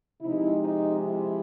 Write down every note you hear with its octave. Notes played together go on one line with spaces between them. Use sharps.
C3 F3 G#3 C4 D#4 E4
D#4
E4